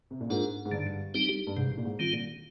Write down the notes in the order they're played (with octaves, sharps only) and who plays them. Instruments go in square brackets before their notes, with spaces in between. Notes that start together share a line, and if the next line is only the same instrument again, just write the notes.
[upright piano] C3
A#2
[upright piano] G#2 [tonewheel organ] D4 F4 A#4
[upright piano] G#2
[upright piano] G2 [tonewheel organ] D3
[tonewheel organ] G3 C4 D#4 G4
[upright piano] G2
[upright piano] G#2 [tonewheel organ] C3
[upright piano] A#2
G#2
[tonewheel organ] D#3 G3 C4 F4
[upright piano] A#2